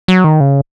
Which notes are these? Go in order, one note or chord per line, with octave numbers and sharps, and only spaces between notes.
F#3
D#3
C#3